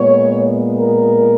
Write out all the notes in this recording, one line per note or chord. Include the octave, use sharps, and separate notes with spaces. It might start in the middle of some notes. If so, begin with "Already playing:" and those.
Already playing: A#2 G#3 B3 C#5
A#4